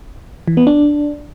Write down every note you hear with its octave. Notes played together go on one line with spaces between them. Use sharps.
E3
B3
D4